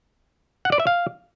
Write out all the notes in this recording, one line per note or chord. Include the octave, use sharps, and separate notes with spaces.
F#5
D5
E5
F5